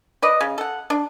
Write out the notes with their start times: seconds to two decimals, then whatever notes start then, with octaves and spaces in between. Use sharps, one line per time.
0.22 B4 D5 D#5
0.41 C#3
0.58 A4 F#5
0.90 D4